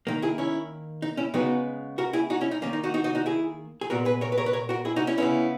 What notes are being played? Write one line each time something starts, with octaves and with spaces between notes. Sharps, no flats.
D#3 A#3
E4 G#4
C#4 E4
D#4
C#4 E4
C#3 G#3 B3 D#4 F#4
F#4 A#4
E4 G#4
D#4 F#4
C#4 E4
D#4
D#3 A#3 C#4
D#4
D#4 F#4
D#4 F#4
D#4 F#4
D#4 F#4
E4 G#4
G#4
A#2 G#3 B3 F#4 A#4
G#4 B4
A#4 C#5
B4
A#4 C#5
B4
A#4 C#5
F#4 A#4
E4 G#4
D#4 F#4
C#4 E4
C#3 G#3 B3 C#4 E4